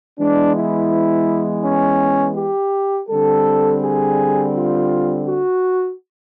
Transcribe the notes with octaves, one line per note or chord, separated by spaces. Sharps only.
E3 G#3 B3 D4
E4
C#4
G4
D3 G3 C4 A4
G#4
F4
F#4